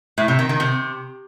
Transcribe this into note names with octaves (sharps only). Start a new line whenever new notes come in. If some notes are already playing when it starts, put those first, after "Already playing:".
A2
C3
D#3
D#3
C3